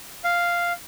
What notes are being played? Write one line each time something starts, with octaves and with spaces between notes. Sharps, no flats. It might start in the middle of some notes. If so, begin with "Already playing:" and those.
F5